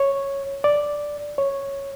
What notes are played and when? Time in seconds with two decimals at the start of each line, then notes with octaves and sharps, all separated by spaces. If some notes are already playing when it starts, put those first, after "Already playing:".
Already playing: C#5
0.64 D5
1.38 C#5